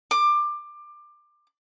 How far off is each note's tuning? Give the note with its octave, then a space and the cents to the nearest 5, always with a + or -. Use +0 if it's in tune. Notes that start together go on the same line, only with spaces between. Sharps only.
D6 +20